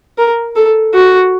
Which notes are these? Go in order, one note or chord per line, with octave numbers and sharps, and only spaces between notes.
A#4
A4
F#4